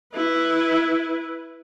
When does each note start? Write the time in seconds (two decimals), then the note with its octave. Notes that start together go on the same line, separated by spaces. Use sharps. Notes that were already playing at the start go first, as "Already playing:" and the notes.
0.14 E4 B4